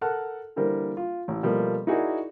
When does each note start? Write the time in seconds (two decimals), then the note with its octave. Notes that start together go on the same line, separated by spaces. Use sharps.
0.01 A4 A#4 F#5 A5 F6 F#6
0.56 D3 E3 G3 A#3 A#4 C5
0.97 F4
1.28 A1
1.43 B2 F3 G3 A3 A#3
1.87 D#4 E4 F#4 G#4 A#4 D5